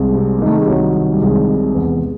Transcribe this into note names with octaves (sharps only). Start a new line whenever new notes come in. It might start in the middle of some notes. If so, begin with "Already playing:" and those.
Already playing: C2 G#3
C3
A#3
D#3 A3
G#3
G3
C2 F#3
D#3
G3
C2 G#3
C3
E2